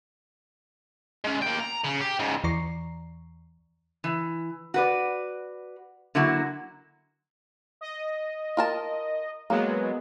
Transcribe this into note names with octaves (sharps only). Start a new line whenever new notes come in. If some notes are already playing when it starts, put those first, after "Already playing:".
G#3 C#4
A#3 G5
A#5
C#3
G4
G#2 C#3
E2 E3 D5 A#5 C#6 C7
E3
F#4 B4 D5
D3 F#3 A#3 E4 F#4
D#5
F4 A#4 A5
F#3 G#3 A#3 B3